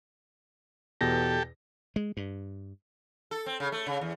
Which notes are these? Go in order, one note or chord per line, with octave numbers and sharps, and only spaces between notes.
E2 B2 G4 A4 A#6
G#3
G2
A4
C4
C#3
A3
C#3
E2